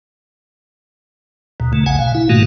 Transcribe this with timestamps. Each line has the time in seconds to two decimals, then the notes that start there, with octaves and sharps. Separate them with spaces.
1.60 D#2 B2
1.73 C#3 A3
1.86 A#1 C#3 F#5 G#5
1.99 B2 F5
2.15 E4
2.29 G#2 B2 D#3 A3 A#3 F#4